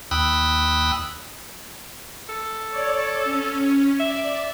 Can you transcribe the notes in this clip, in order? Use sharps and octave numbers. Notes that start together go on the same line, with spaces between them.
D#2 G5 B5 D#6 E6 F#6
A4
C#5 D5
C#4
D5 E5